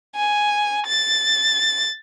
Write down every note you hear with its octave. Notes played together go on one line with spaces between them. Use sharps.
G#5
A6